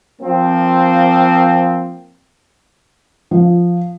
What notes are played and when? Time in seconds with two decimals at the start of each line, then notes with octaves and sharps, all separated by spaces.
0.21 F3 A#3 C4
3.31 F3